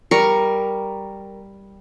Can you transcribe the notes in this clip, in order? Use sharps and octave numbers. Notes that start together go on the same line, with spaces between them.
G3 A#4 C#6